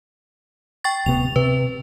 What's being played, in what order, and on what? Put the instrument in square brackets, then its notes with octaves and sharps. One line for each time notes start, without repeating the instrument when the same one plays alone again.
[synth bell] G5 C#6 A6
[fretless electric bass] D1 C3 B3 [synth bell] F7
[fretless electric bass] C3 [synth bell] B4